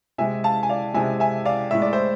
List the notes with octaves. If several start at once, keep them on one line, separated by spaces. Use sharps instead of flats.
C3 G#3 E5 G#5
F5 A5
G#5
D5 F5
C3 G#3 E5 G#5
E5 G#5
D5 F5
A2 G#3 E5
D5
C5 E5